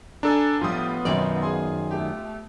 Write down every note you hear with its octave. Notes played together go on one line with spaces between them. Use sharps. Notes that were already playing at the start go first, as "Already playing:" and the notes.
D4 A4 G#5 A#5
A2 F3 G3 B3 F4 D#6
B1 F#2 D#3 D5
G#4 G#5 C6
A3 G4